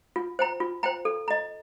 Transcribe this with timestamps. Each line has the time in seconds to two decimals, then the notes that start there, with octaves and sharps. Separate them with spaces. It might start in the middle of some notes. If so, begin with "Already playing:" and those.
0.16 F4
0.39 C5 G5 A#5
0.60 F4
0.83 C5 G5 A#5
1.05 A4
1.28 D#5 A#5